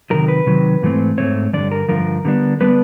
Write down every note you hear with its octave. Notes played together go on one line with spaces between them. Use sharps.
C3 D#3 F#3 A#4
B4
C3 D#3 F#3
G#2 E3 A3 C4
G#2 E3 A3 C4 C#5
G2 D3 F3 D5
A#4
G2 D3 F3 A#4
D3 G3 B3 D4
D3 G3 B3 D4 B4